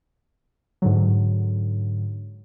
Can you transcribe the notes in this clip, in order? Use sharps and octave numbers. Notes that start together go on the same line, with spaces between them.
G#2 D3 F#3